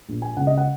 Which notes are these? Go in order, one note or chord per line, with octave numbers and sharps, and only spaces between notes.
A#1 A#2
G#5
C#2 C#3 F#5
D#5
F#5